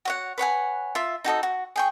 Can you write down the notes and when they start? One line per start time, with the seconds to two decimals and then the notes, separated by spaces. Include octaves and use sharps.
0.05 F#4 C#5 F#5
0.38 B4 C#5 F#5 G#5
0.95 F4 E5
1.24 D#4 F#4 A4 D#5
1.43 F#4
1.76 G#4 G5 C#6